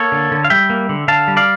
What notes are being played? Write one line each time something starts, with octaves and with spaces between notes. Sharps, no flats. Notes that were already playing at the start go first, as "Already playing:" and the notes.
Already playing: A#3 A4 C#5
D3
D3
F5
G3 E5 G5
A#3
D3
D3 F5 A5
G3
D5 F5